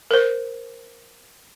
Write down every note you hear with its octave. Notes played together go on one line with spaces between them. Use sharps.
A#4 C5